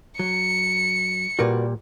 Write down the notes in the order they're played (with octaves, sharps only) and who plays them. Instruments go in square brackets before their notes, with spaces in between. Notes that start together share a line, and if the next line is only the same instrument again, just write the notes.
[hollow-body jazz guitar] F#3 [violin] C#7
[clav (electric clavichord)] A#2 G3 [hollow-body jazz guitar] F#4 A#4 B4